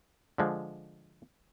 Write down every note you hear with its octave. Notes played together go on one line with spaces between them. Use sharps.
D3 F3 G#3